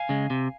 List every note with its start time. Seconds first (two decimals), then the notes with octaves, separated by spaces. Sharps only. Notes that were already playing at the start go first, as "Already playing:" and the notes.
Already playing: F5 G#5
0.09 C#3 G#3
0.30 C3